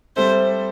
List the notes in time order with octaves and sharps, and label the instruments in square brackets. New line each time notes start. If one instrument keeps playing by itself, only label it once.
[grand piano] G3 C4 A4 E5 [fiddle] C5